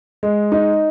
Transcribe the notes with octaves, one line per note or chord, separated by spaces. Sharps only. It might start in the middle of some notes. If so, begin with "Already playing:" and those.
G#3
D#4